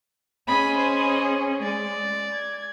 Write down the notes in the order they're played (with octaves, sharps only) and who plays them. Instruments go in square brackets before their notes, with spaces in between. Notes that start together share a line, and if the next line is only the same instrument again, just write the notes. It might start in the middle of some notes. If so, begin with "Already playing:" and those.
[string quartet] C#4 G#4 D#5 [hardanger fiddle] B5
[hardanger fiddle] C5
[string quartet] G#3 [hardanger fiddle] D5
[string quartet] G#6